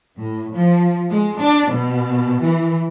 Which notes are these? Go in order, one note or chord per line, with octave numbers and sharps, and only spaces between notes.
A2
F3
G#3
D4
B2
E3